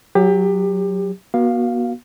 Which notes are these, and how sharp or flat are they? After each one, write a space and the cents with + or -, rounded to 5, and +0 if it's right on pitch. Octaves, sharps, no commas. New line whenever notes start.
F#3 +0 G4 +25
B3 -45 F#4 +0 F5 +0